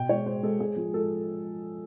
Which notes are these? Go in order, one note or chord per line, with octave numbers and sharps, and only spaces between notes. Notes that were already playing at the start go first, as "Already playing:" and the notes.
Already playing: B2 G5
G#3 C#5
G#3 C5
G#3 A4
G#3 G#4
F3
G#3 A4